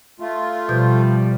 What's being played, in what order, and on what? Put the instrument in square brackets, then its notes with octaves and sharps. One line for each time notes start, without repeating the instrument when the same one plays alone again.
[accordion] A3 F4
[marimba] B2 G6 [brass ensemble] F3 G3